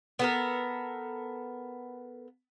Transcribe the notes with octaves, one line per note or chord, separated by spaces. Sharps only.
B3 A4 A#4